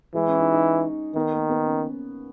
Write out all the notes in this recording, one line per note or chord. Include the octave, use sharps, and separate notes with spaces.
E3 G#3
C#4
D#4
D#4
D#3 B3
A#3
B3
C#4